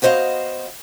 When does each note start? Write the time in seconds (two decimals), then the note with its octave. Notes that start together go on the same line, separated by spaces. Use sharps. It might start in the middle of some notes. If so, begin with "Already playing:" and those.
0.02 B3 F#4 C5 D#5 F5